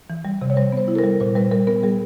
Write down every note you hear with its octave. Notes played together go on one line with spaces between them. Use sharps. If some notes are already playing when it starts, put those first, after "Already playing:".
E3
G3
C3
C#5
G3 C5
B3 C5
E4
A4
A#4
G3
A#2 C5
G3 B4
G3 A#4
B3 A#4
G3 G#4